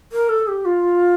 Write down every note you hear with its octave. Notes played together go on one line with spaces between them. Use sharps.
A#4
A4
G4
F4